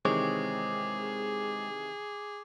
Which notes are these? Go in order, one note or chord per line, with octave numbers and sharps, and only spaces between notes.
C3 D#3 E3 G#3 C4 G#4 C#5 D6